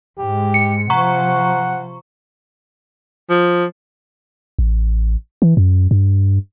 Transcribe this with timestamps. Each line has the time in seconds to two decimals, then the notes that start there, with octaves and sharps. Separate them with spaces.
0.18 G#2 G#3 G4
0.54 C#7
0.90 C3 F3 F#5 A#5 C#6
3.29 F3
4.59 A1
5.42 E3
5.57 F#2
5.91 G2